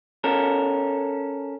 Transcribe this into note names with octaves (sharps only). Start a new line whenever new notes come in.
C#4 A4 A#4